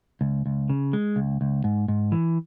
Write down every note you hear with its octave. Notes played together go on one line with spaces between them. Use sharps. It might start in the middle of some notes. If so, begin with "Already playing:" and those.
C#2
C#2
C#3
G#3
C#2
C#2
G#2
G#2
E3